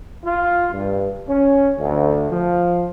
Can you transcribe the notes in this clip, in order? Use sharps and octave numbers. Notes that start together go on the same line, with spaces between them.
F4
G2
C#4
D2
F3